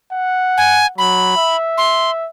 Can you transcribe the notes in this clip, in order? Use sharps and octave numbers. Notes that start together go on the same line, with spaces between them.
F#5
G#5
F#3 B5
E5
C6